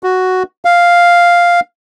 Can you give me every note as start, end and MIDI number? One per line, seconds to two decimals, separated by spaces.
0.03 0.43 66
0.65 1.60 77